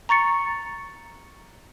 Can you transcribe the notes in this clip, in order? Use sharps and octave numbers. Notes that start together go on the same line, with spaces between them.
A#5 C#6 A6 C#7